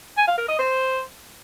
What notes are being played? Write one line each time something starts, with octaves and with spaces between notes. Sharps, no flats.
G#5
F5
A#4
D#5
C5